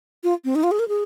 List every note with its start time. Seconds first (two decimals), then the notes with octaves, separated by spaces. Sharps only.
0.24 F4
0.45 C4
0.55 D#4
0.63 F4
0.71 G#4
0.79 A#4
0.88 G#4